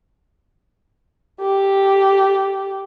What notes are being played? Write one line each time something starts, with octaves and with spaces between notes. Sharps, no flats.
G4 A4